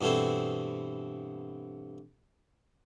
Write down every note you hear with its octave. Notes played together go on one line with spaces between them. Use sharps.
G2 B2 E3 A3 C4